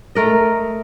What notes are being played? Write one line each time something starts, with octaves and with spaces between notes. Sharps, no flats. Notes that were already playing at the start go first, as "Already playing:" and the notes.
A3 A#4 D#5